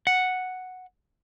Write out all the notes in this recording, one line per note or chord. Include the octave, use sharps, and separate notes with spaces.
F#5